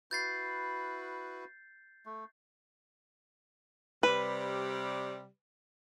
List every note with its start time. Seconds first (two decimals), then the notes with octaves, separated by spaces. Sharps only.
0.11 E4 F#4 B4 G6 A6 C7
2.06 A3
4.03 C3 G3 B4